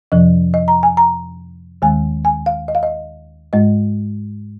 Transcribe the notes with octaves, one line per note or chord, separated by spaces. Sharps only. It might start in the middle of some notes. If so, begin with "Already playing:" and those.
F2 C3 F3 D#5
D#5
A#5
G#5
A#5
D#2 D#3 G#3 G#5
G#5
F5
D#5
F5
D#5
G#2 G#3 D#5